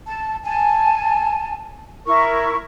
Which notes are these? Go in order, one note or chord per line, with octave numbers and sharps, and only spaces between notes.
A5
G#5 A5
E4 A#4 C#6